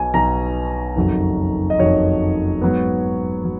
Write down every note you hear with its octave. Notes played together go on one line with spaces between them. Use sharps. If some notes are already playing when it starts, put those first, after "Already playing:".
Already playing: B1 B2 F#3 G#5
B1 B2 F#3 A#5
F#1 F2 D#3 F#3
D#5
F#1 F2 D#3 F#3 C#5
G#2 F#3 B3
F#3